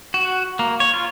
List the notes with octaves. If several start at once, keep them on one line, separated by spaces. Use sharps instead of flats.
F#4
A#3
C#5
F4